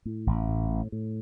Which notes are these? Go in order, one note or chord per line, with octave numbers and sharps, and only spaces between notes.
A2
A1
A2
A2
A2